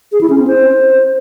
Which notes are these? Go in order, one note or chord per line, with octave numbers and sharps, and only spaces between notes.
G#4
E4
C#4
C4
C5